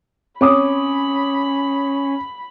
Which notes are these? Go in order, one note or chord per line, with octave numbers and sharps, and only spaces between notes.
C4 C#4 C#5 B5 D6 D#6